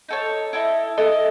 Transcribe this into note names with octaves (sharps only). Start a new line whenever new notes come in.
D#4 A4 C#5
E4 A4 D#5
E4 A4 D#5